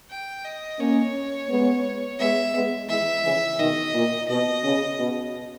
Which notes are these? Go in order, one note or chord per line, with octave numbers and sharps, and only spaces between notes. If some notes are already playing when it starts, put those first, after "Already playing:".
G5
D#5
A#3 C#4 C#5
G#3 B3
G#3 B3 E5
G#3 B3
E3 G#3 E5
C#3 E3
B2 D#3 D#5
A#2
B2 D#5
C#3
B2